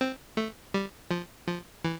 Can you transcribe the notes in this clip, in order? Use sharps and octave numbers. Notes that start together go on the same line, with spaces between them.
C4
A3
G3
F3
F3
E3